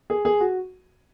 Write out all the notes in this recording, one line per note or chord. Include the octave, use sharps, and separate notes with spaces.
G#4
G#4
F#4